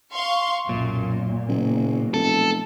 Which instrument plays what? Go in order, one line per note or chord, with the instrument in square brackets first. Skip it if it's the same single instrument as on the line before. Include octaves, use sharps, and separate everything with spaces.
[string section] F5 C6 C#6
[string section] B1 F#2 [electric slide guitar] A#2
[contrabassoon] F#1 [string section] B2
[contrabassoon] F1 [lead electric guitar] A4